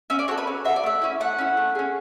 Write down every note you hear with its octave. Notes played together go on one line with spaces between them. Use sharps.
C#4 E5
D5
F#4 A4 C#5
B4
C#4
F#4 A4 E5
D5
A3 E5
C#4 E4
A3 F#5
C#4 E4
A3
C#4 G#4